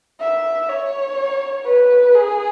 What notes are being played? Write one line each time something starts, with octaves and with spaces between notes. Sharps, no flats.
E5
C#5
B4
G#4